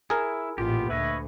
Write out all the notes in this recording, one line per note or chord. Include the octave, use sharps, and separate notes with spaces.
E4 G#4 A#4
A1 A#2 B3 F4 G4
D2 B4 C#5 D#5 E5